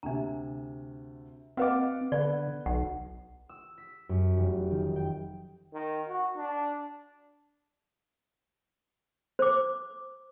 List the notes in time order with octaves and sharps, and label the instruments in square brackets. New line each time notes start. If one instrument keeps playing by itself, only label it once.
[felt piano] D2 C3 [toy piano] D4 A#5
[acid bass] C4 [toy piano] F#4 B4 D#5 [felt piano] F5 F#5 D6
[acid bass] D3 [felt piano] B3 [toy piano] D5
[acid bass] B1 [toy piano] F#5
[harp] E6
B6
F#2
F1
D#3
G5
[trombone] D#3
F#4
D4
[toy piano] C5 D6